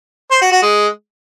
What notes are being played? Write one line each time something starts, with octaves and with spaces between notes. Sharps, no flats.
C5
F#4
F#4
G#3